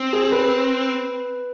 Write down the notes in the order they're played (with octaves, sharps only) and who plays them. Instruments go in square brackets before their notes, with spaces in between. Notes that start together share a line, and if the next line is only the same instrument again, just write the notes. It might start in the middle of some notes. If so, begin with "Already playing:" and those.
Already playing: [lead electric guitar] C4
[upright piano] G#4
B4